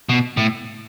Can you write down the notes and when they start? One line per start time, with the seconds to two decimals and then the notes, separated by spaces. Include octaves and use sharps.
0.09 B2
0.37 A2